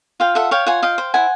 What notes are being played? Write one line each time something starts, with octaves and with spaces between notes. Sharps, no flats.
F4 F5 G5
A4 E5 F#5
C#5 F5 G5
F4 F#5 G#5
D#5 F5 G5
C5
E4 F#5 G#5